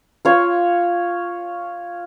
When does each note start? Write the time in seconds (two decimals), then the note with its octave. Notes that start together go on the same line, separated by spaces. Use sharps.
0.25 F4 C#5